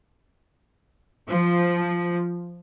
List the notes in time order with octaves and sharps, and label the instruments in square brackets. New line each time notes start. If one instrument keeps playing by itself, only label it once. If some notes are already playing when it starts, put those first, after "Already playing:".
[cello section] F3